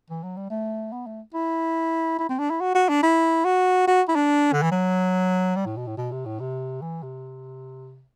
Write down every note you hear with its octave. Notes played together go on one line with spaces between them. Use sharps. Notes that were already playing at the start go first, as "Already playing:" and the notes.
E3
F#3
G3
A3
B3
A3
E4
E4
C4
D4
E4
F#4
F#4
D4
E4
F#4
F#4
E4
D4
D3
E3
F#3
G3
A2
B2
A2
B2
C3
A2
C3
E3
C3